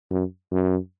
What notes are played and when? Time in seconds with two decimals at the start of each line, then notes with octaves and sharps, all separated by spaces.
0.10 F#2
0.51 F#2